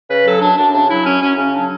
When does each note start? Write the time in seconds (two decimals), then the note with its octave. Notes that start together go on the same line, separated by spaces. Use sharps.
0.10 C#3 B4
0.26 F#3 A4
0.42 F#2 D4
0.58 F#2 D4
0.74 C#3 D4
0.90 F#3 E4
1.05 F#2 C#4
1.22 F#2 C#4
1.38 C#3 C#4
1.54 F#3 D4